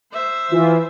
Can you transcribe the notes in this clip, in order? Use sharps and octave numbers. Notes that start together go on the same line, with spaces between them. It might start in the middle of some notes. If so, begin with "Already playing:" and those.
C5 E5
E3 F4